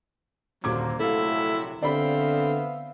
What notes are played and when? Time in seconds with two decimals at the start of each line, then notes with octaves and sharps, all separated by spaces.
0.64 D#1 D3 F#3 A#3 C5 D6 G#6
0.99 A#1 C3 F#3 A3 E4 A4 F5
1.83 D3 B3 C4 D5 E5 F5 B5